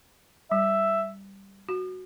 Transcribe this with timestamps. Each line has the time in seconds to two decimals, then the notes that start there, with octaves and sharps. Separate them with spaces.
0.51 G3 E5
1.69 F#4